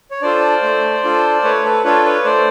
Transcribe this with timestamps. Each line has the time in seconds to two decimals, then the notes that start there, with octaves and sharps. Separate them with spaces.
0.11 C#5
0.22 D4 F4 A4 C5 D5
0.62 A3
1.04 D4 F4 A4
1.44 A3 B4 C#5
1.65 A4 B4
1.84 D4 F4 A4 B4 C#5
2.05 B4 C#5
2.25 A3 C5 D5